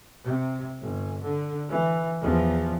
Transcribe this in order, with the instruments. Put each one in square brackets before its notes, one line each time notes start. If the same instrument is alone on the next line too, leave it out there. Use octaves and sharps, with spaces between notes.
[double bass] C3
G1
D3
E3
E2 F3